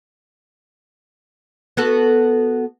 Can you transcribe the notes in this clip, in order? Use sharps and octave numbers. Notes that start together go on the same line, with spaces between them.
B3 F#4 A4